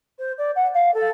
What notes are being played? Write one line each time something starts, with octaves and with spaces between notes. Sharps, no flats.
C5
D5
F#5
F5
A4